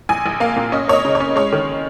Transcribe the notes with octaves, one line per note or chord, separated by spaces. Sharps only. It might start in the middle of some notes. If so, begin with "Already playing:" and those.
A#1 G#5
A#1
A#3 F5
A#2
C#4 D#5
A#3 C#5
D#5
C#3
C#5
C#4
G#3 C#5
D#3